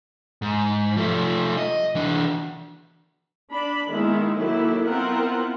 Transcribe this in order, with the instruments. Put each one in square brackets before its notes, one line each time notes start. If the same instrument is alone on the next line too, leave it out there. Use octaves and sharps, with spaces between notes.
[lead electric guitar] G#2
F3 A3
D#5
E3 D4
[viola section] D4 B5
D#3 G#3 A#3 B3 E4
D#3 F#3 A#3 E4 A4
B3 C4 E4 F4 A#4 F#5